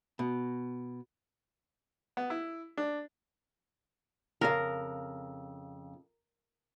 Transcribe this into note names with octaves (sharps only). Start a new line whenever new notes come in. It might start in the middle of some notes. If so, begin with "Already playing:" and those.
B2
B3
E4
D4
F2 C#3 A#4 F5